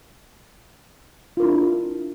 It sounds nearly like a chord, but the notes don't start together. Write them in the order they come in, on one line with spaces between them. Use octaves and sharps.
F4 A#4 E4 D4